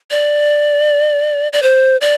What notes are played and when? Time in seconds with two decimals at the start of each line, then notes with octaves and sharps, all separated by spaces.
0.11 D5
1.53 D5
1.62 C5
2.01 D5